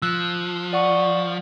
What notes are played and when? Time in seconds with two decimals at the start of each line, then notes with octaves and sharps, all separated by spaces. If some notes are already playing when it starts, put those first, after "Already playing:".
0.02 F3 E6 F#6
0.73 D5 F#5 C#6